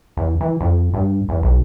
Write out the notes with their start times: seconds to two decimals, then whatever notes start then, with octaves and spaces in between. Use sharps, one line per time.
0.17 E2
0.41 E3
0.61 F2
0.94 G2
1.29 E2
1.43 B1